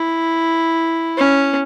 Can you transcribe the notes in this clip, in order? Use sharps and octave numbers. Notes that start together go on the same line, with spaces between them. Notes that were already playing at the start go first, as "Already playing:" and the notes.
Already playing: E4
C#4